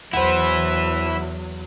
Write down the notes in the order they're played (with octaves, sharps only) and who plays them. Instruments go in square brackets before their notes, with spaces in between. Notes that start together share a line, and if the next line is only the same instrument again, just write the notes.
[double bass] E2 F#3 [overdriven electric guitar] E4 B4 [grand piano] C5 F#5 [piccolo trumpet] E5